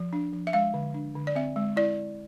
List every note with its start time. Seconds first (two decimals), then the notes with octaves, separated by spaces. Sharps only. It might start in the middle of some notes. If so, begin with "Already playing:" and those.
Already playing: F3
0.13 D4
0.33 F3
0.47 E5
0.53 G#3 F5
0.74 D3
0.94 D4
1.15 D3
1.27 D5
1.35 C4 E5
1.56 G#3
1.76 E4 D5